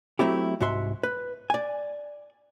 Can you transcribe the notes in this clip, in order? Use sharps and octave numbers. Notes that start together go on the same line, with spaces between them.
F#3 A3 C4 E4 G4
C2 G#2 F#4 E5 C6
B4
D5 G#5